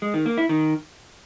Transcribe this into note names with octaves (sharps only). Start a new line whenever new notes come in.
G#3
D#3
A#3
E4
D#3